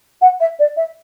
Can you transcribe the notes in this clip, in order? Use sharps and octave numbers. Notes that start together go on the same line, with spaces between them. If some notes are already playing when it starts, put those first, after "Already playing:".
F#5
E5
D5
E5